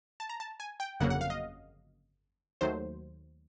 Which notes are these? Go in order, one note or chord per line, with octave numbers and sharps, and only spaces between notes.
A5
A#5
A5
G#5
G5
G1 F2 C#3 F#3 A#3 F#5
F#5
F5
D#5
D#2 D#3 F#3 A3 C5